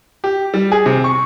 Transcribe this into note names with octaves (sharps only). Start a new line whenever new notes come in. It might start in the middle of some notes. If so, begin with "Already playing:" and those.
G4
G3
G#4
C3
C#6